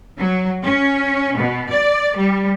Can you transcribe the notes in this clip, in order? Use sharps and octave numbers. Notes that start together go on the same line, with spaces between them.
F#3
C#4
B2
D5
G3